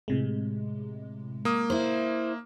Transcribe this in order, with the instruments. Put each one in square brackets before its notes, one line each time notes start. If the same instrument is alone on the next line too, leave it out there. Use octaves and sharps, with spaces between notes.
[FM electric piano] A2 C3 G#3
[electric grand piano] A#3 D#6
[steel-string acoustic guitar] E4 C5